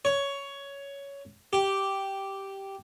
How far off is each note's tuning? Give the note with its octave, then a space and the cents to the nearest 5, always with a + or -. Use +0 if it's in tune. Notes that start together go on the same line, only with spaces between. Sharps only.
C#5 +10
G4 -5